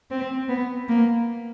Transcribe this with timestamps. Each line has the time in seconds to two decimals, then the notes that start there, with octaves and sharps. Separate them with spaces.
0.11 C4
0.49 B3
0.88 A#3